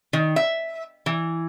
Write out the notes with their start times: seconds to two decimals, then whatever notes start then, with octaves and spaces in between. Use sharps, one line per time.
0.13 D#3
0.36 E5
1.06 E3